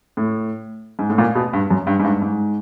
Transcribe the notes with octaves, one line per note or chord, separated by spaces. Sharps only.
A2
G#2
A2
A#2
B2
G2
F#2
G2
G#2
G2
G#2